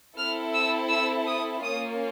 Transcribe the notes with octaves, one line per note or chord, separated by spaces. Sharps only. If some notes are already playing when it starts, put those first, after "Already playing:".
C4 E4 A4 F6
E6
E6
D#6
A#3 C#4 F4 D#6